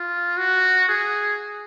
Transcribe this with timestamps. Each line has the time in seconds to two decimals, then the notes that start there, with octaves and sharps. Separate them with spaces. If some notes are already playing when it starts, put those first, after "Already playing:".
Already playing: F4
0.37 F#4
0.88 G#4